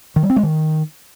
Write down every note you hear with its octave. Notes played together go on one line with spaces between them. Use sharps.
D#3
G3
C4
G#3
D#3